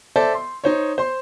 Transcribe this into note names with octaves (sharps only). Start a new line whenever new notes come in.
A4 C5 D5 E5 A5
C6
D#4 C5 C#5
C5 C6